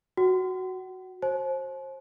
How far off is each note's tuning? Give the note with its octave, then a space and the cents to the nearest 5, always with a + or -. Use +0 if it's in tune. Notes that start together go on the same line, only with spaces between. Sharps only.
F#4 +0 F#5 +40
C5 +30 A5 -45